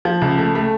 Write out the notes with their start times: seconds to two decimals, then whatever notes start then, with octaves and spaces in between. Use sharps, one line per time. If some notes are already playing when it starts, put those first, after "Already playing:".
0.05 F3
0.22 C#2
0.38 A3
0.55 A3